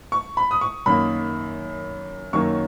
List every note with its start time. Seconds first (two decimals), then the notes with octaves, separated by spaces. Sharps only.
0.12 C#6
0.37 B5
0.51 D#6
0.61 C#6
0.86 F#2 D#3 A#3 B5
2.33 F#2 D#3 F#3 A#3 C#6